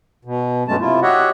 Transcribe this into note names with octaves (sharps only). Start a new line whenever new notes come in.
B2
G2 F#3 G#3 A3 C#4 A5
C3 E4 F4
F#4 G4 C#5 D#5 E5 F#5